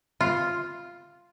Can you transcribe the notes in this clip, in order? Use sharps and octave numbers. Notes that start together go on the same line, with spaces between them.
F4